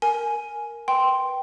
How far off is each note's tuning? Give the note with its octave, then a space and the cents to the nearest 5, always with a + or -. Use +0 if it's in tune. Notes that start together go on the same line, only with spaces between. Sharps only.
A#4 +0 G#5 +10
B4 +0 G5 -10 C6 +0